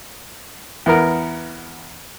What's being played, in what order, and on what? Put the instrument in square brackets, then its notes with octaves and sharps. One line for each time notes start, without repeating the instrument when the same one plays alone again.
[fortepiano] E2 B3 A#4